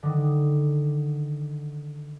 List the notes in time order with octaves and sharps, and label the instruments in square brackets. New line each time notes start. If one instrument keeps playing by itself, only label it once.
[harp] D3 D#3